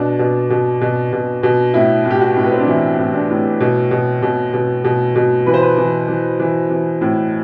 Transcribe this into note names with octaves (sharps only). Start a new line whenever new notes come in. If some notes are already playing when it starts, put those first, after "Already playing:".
Already playing: B2 D4
B2
B2
B2
B2
B2
A2 E4
A2
G4
F#4
A2
B3
C4
D4
E3 E4
A2
D4
A2
B2
B2
B2
B2
B2
B2
E3 B4
C5
B4
E3
E3
E3
E3
A2